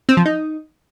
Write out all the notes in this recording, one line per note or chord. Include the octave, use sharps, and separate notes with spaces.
C4
F3
D#4